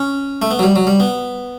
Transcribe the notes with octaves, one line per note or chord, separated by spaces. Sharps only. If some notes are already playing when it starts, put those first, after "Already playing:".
Already playing: C#4
A3
B3
F#3
G3
F#3
G3
B3